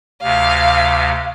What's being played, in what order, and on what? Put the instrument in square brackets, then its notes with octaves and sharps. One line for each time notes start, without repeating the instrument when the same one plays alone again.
[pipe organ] D2 C3 [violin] F5